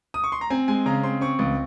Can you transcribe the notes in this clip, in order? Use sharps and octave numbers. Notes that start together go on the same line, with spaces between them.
D#6
C#6
C6
A#5
C4 G#5
G#3 G#5
C#3 A#5
C4 C6
C4 C#6
C#2